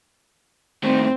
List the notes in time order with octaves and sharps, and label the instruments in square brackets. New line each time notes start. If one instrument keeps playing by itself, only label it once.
[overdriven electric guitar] A2 D#3 [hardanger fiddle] C4